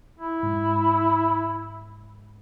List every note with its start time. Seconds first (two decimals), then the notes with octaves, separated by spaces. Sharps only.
0.20 E4
0.43 G#2